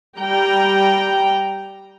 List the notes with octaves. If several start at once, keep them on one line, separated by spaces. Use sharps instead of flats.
G3 G5 A#5